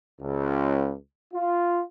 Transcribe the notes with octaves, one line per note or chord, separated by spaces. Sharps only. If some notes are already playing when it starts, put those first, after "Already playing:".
C#2
F4